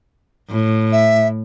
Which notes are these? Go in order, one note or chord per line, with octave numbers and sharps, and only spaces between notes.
A2
E5